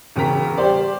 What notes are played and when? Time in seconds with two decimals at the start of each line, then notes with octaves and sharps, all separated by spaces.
0.16 E1 C#3 A#4 A#5 B6
0.58 G3 G4 C5 D5